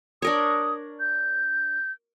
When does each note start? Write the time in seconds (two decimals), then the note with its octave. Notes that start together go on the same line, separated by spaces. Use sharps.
0.22 D4 A#4 C#5 D#6
1.00 G6